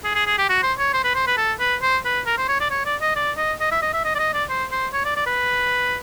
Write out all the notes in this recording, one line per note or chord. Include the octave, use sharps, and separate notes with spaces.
G#4
G#4
G#4
G4
F#4
C5
C#5
C5
B4
C5
B4
A4
B4
C5
B4
A#4
C5
C#5
D5
C#5
D5
D#5
D5
D#5
D#5
E5
D#5
E5
D#5
D5
D#5
D5
C5
C5
C#5
D5
D5
B4